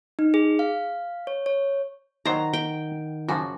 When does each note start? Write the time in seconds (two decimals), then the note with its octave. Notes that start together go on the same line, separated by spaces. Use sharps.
0.19 D#4
0.34 G#4
0.59 F5
1.27 C#5
1.46 C#5
2.25 D#3 F#3 C5 D5 D#5 F#5 A#5
2.53 G5
3.29 F#2 C#3 F3 F#4 G#5 D6 A#6